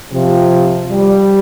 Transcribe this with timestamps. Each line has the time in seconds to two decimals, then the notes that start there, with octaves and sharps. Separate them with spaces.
0.12 C3 F3
0.91 G3